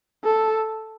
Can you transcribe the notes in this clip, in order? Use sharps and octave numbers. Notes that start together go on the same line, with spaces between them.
A4